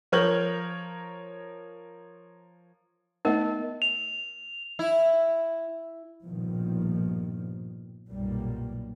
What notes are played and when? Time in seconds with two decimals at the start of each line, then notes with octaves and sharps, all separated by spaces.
0.12 F3 A#4 C#5 F6 G6 F#7
3.25 A3 B3 D#4 A#4 D#5 F#5
3.82 F7
4.79 E4
6.24 A#1 G2 B2 D#3 F3 G3
8.10 B1 F#2 A#2 G3 A#3